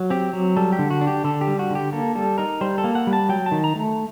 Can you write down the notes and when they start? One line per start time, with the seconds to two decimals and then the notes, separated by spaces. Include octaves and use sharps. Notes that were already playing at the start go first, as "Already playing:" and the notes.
Already playing: F#3
0.10 C4 G4
0.33 F#3
0.56 G3 A4
0.72 G4
0.79 D3
0.90 F#4
1.01 D4
1.07 G4
1.24 D3 A4
1.41 G4
1.47 G3
1.59 F#4
1.70 D3 G4
1.93 A#3 A4
2.15 G3 A4
2.38 D#4 A#4
2.61 G3 C5
2.78 A4
2.84 A#3
2.95 F#5
3.07 G3
3.13 A5
3.29 F#3 G5
3.46 A5
3.52 D#3
3.64 A#5
3.75 A3